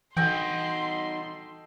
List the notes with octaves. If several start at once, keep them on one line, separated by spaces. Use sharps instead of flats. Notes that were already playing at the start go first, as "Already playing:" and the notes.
E3 D#4 F#4 A4 D#5 G5 C6